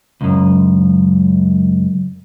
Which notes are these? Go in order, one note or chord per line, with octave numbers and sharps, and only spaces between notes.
C#2 F#2